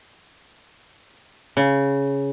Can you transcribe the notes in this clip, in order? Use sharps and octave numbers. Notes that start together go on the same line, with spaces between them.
C#3